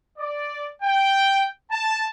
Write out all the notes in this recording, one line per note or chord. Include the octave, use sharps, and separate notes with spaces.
D5
G5
A5